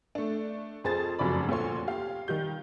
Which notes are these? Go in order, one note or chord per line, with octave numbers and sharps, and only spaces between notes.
A3 D4
F2 G#4 C5 A6
F1 F#2 C#3 D5 B5
D2 A#2 A4 C#5 C6
G4 F5
D#3 G3 G6